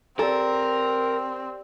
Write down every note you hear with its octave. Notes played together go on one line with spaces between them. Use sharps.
C4 G4 A4 A#4 D5